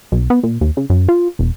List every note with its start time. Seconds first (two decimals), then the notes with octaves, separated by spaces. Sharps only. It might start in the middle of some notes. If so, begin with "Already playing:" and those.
0.12 B1
0.30 B3
0.43 A#2
0.61 D#2
0.77 C#3
0.90 F#2
1.08 F4
1.39 E1